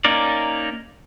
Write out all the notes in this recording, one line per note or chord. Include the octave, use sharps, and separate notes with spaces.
A#3 C#4 D#4 A#4 D5